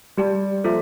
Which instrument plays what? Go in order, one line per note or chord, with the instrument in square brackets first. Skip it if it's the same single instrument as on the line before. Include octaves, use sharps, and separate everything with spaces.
[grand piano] G3 [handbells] G4 D5 A5
[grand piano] F3 [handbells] A#3 F4 A4 C5 E5